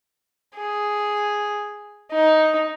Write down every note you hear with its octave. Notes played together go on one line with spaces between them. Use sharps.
G#4
D#4